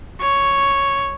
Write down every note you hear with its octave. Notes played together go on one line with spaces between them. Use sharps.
C#5